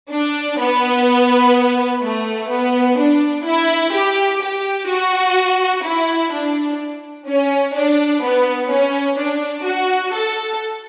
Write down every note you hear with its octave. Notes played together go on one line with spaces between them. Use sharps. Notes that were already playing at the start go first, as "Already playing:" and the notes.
D4
B3
A3
B3
D4
E4
G4
G4
F#4
E4
D4
C#4
D4
B3
C#4
D4
F#4
A4